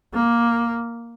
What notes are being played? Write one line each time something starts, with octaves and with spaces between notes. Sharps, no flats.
A#3